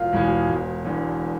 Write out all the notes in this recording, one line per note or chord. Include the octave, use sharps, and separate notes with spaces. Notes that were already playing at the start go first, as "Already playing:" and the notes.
Already playing: E1 F4 F5
E2 B2 G#3
E1
E2 D3